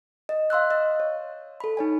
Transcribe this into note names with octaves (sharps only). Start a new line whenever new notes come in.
D#5
F5 C6 E6 F#6
D#5
C#5
A4 B5
D#4 C#5 G#5